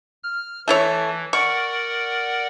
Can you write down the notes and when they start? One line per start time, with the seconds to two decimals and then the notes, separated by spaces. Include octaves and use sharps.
0.23 F6
0.68 E3 A3 E4 C#5
1.33 A#4 D5 F#5 C#6